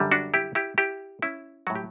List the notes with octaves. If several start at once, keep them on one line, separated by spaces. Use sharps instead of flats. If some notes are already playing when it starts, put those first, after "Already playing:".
Already playing: F#2 D3 G3
D4 F#4
E4 G4
E4 G4
E4 G4
C#4 E4
A2 F#3 F#4
G4